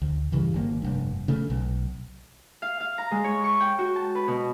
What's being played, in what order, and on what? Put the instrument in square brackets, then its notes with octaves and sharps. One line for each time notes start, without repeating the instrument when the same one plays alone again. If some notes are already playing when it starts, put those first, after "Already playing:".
[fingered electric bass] D2
G2 C#3 E3 G3
G#1 C3 A#3
F1 G2
C#3 A3
B1
[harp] F5
F5
A#5
G#3
C#5
C#6
G5
F#4
A5
B4
B2